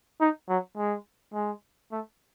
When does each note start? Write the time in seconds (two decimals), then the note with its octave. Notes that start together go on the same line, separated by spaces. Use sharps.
0.21 D#4
0.49 F#3
0.77 G#3
1.34 G#3
1.92 A3